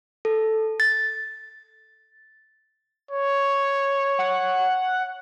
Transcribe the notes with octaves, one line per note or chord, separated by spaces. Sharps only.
A4
A6
C#5
F#5